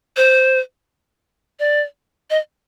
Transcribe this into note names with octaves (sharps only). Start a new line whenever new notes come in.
C5
D5
D#5